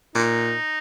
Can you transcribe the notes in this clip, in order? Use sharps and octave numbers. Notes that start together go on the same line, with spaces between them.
A#2 D#4